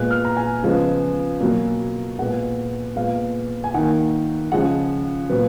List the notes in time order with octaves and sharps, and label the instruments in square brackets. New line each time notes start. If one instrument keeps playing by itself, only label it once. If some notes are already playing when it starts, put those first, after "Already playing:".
Already playing: [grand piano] A#2 G#3 B3 F#6
F6
A#5
G#5
C#3 F3 G#3 B3
B2 F#3 A#3
A#2 G#3 B3 F#5
A#2 G#3 B3 F5
G#5
D#3 A#3 F#5
C#3 F3 G#3 F#5
A#2 F#3 B3